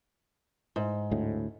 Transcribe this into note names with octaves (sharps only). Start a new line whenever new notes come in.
G#2
D2 A2